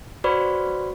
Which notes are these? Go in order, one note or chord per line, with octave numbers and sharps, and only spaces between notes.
F#4 B4 C5 D5 B5 C#6